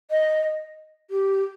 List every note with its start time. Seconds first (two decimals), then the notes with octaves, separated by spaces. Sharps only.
0.10 D#5
1.10 G4